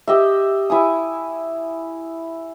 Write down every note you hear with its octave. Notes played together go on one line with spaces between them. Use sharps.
G4 D#5 E5
E4 G#5 D#6